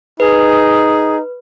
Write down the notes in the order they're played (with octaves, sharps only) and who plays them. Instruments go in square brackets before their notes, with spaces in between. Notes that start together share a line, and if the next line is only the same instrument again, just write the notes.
[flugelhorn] D#4 [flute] G#4 [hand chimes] B4